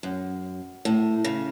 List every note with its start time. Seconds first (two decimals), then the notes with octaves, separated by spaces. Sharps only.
0.03 F#2
0.85 A2
1.24 C#3